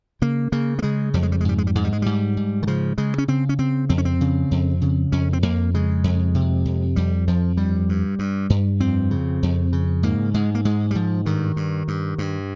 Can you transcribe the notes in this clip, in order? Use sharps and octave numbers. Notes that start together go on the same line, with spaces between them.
C#3 A#3
C#3 A#3
A#3
C#3 G#3
F2 G3
G#3
G3
G#3
G#2 G3
G#3
G3
G#2 G#3
G3
G#3
G#2 G3
G#2
D#3
C#3 F3
C#3 G#3
C#4
C#3 C4
C#4
C#3 C4
F2 C4
C#4
C4
C#3
F2
C#3
F2 C#4
C4
F2 A#3
C#3 G#3
F2
C3
F2
F2 G3
F2 F3
G2 G3
G2
G2
G2
F2 C4
C#3
F2
C#3
G#2 A#3
G#2 G#3
A#3
G#2 G#3
G3
G#2 F3
G2 D#3
G2
G2
G2